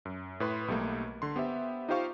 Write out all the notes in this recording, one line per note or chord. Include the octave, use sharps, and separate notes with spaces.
F#2
A2 B4 C6
B1 G3 A3 A#3
D3 C6
B3 G4 C5 E5
D#4 F4 G4 C5 F5 C#6